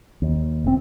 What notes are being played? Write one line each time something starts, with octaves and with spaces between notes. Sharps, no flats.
D#2
F1 A2 C4